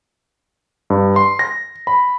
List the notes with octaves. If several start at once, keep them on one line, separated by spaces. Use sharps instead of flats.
G2
C6
A#6
B5